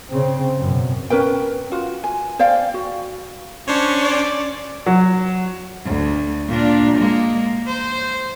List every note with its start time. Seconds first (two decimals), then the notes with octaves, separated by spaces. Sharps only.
0.11 C#3 C4
0.59 F#2 B2
1.10 C#4 A#4 B4 G5
1.72 F4 F#4
2.04 G#5
2.39 C5 D5 F5 G5
2.74 F#4
3.68 C#4 D4 C5 C#5
4.04 D5
4.86 F#3
5.85 D2
6.48 A#2 D4
6.97 G#3 A#3
7.67 C5